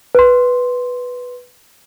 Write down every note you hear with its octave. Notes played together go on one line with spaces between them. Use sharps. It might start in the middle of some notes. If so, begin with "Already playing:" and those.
B4 C6